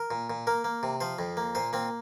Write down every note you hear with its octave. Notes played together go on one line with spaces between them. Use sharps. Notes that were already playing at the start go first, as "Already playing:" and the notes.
Already playing: A#4
A#2
A#2
A#3 A#4
A#3
C3
F3 C5
F2
A#3
A#2 C5
A#3 C4